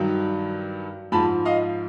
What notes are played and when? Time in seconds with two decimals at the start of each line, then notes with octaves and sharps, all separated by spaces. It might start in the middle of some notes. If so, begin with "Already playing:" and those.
Already playing: G2 D#3 F#3
1.12 G#2 F3 A5 B5
1.45 D#5 F5